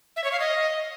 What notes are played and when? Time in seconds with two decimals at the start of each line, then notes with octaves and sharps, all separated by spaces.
0.16 E5
0.24 C#5
0.32 F5
0.40 D#5